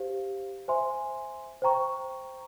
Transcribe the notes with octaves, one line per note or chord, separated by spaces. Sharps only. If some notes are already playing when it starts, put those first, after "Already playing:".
Already playing: G4 C5 F5
C5 E5 G#5 C6
C5 G5 A#5 C#6